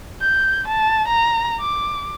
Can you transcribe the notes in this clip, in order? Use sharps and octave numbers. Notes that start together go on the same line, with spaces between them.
G6
A5
A#5
D6